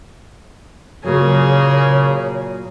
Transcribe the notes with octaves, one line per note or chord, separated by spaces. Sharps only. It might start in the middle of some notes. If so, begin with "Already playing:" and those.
A#2 C#3 F#3 A#3 G#4 C#5